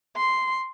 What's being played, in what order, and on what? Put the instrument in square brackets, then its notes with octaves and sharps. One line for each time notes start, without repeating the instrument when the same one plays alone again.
[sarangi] C6